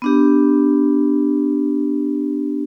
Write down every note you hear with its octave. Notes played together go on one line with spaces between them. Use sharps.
B3 D4 G4